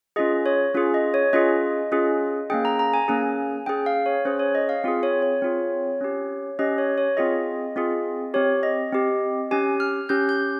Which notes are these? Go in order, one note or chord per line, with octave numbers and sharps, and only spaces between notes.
C#4 F4 G#4 D#5
C#5
C#4 F4 G#4
D#5
C#5
C#4 F4 G#4 D#5
C#4 F4 G#4
A#3 C#4 G#4 G5
A#5
A#5
G#5
A#3 C#4 G#4
C#4 G#4 G5
F5
C#5
C#4 G#4 C5
C#5
D#5
F5
C4 F4 G#4
C#5
C#5
C4 F4 G#4
C#4 G4
C#4 G4 D#5
C#5
C#5
C4 F4 G#4 D#5
C4 F4 G#4
C4 G4 C#5
D#5
C4 G4
C#4 G4 G#5
F6
C#4 G4 G6
G6